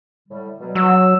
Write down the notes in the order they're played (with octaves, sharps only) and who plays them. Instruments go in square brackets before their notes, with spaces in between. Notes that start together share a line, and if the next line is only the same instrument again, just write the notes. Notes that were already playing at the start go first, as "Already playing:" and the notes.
[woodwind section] A2 D3 G3
B2 F#3 G3
[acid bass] F#3 [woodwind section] E6